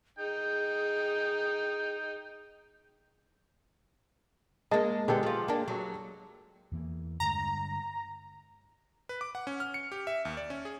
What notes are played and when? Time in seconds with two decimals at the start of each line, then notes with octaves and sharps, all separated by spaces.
0.18 D#4 G#4 G5
4.71 G#3 A#3 D#5 A5
5.08 D3 G#3 B3 G4 A4
5.23 F3 F4
5.48 A#3 D4
5.68 F#3
6.72 E2 E3 A#3
7.20 G2 D3 G#3 A#5
9.09 B4
9.21 D6
9.35 F#5
9.47 C#4
9.60 F6
9.74 C#7
9.92 G4
10.07 E5
10.25 D#2
10.37 D5
10.50 C#4
10.65 G#4